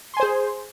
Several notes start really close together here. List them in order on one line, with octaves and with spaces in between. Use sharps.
C6 G#5 C5 G#4